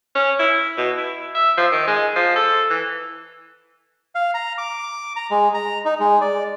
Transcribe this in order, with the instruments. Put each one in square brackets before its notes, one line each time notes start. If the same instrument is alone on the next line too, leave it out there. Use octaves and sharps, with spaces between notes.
[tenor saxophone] C#4
E4
B2
E4
E5
F3
D#3
G#3
F3
A4
E3
[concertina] F5
A#5
D6
A#5
G#3
A#5
D#4
G#3
D5